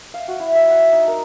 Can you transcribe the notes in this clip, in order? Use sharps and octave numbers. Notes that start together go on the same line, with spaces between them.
F5
F#4
E4
E5
F#5
D#4
A#4